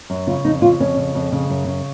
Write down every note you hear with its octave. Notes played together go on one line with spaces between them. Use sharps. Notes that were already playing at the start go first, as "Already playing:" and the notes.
F#2
C#3 F4
F2 D#4
C#3 F4
F2 C#4
C#3
F2
C#3
F#2
C#3